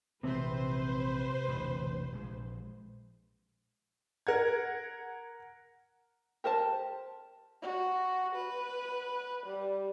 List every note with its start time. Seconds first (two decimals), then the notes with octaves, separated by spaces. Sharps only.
0.23 A#1 C3 E3 G#3 C4 B4 C5
1.48 E1 A1 D3
2.12 A#1 G#3
4.27 A#4 F#5 G#6
6.44 G4 A#4 C5 A5
7.62 F#4
8.35 B4
9.46 G3